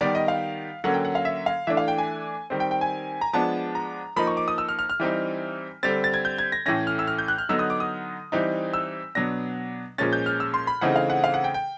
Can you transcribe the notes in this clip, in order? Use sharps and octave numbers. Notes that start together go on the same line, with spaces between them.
D#3 G3 B3 D5
D#5
F5
D3 F#3 A#3 C#4 F#5
G5
F#5
F5
E5
F5
E3 A3 D4 E5
F5
G5
G#5
D#3 G3 C4
G5
G5
G#5
A#5
F3 G#3 B3 D4 A5
A#5
F3 A#3 D#4 B5
C#6
D6
D#6
E6
F6
F6
F6
E3 G3 C4 D#4
D3 G3 C4 A6
A6
G#6
G6
G#6
A#6
A2 E3 A3 C#4 A#6
F6
E6
F6
G6
F#6
F6
D3 F#3 B3 D#4 E6
D#6
D6
D#6
E3 G3 C4 D#4
E6
B2 F#3 B3 D4 A#6
A#2 F3 G#3 C#4 A6
G6
F6
E6
C6
B5
C#3 E3 A3 C4 D#4 F#5
F5
F#5
F5
F#5
G5
G5